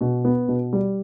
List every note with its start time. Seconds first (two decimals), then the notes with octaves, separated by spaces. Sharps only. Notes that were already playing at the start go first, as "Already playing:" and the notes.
0.01 B2
0.25 B3
0.48 B2
0.73 G3